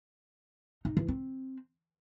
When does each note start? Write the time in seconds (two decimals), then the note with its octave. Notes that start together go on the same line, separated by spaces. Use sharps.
0.85 D#4
0.97 E3
1.08 C4